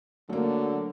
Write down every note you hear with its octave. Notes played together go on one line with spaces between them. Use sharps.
D3 F#3 A3 A#3